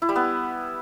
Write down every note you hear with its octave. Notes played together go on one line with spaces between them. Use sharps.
E4
G3
B3